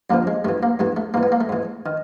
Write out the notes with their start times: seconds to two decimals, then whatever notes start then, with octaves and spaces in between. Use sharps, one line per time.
0.10 F#2 D3 F3 A#3
0.27 G#3
0.44 G2 E3 A3
0.63 A#3
0.79 G2 E3 A3
0.97 A3
1.14 G#2 E3 A#3
1.23 B3
1.32 A#3
1.41 A3
1.49 G#2 E3
1.86 D#3